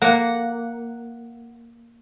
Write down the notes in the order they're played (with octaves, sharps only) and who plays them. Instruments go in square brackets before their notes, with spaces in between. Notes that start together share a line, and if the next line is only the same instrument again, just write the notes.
[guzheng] A#3 [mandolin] F#5